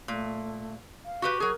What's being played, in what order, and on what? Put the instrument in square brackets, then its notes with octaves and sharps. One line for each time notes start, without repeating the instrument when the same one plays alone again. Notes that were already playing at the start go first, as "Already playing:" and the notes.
[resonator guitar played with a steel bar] A#2 [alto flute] A3
[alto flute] F5
[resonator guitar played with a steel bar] F#4 G4 B4
[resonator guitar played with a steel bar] F#3 G#4 [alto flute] A#4